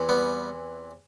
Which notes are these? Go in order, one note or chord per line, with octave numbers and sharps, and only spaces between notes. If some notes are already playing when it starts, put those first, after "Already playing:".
Already playing: E2 C3 E3
G3 B3